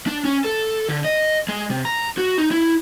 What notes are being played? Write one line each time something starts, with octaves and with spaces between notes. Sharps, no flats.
D4
C#4
A4
D3
D#5
G#3
C3
A#5
F#4
D#4
E4